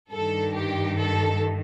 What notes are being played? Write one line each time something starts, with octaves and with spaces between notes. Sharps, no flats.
G2 D#3 A4
G4
A4